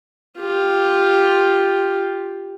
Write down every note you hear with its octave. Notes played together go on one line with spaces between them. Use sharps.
F4 G4